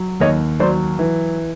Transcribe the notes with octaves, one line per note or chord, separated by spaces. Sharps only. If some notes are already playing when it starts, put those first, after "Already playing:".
Already playing: F#3
D#2 C#5 D#5
F#3 C5 D5
E3